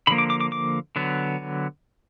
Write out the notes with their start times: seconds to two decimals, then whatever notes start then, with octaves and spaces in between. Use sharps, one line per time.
0.07 D3 F3 A#3 B5
0.18 D6
0.30 D6
0.40 D6
0.52 D6
0.96 D3 F#3 B3